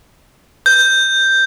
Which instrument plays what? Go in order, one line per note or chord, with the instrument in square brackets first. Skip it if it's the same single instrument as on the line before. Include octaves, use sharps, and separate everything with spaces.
[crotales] G6